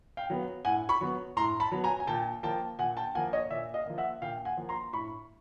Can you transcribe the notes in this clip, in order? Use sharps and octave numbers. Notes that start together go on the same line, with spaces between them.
F5 G5
F#3 B3
A2 F#5 G#5
B5 C#6
F#3 B3
A2 A#5 C6
A5 B5
F#3 B3
G#5 A#5
G#5
A#2 G5 A5
F3 A#3 G5 A5
A#2 F#5 G#5
G5 A5
F3 A#3 F#5 G#5
C#5 D#5
A#2 D5 E5
D#5 F5
F3 A#3
E5 F#5
A#2 F5 G5
F#5 G#5
F3 A#3
A#5 C6
A2 B5 C#6